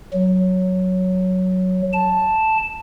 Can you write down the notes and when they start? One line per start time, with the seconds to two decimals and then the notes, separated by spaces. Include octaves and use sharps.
0.14 F#3
1.93 A5